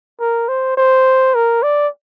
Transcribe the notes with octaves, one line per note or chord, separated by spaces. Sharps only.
A#4
C5
C5
A#4
D5